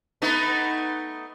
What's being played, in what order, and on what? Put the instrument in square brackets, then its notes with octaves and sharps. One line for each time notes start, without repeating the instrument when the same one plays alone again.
[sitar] A3 B3 D#4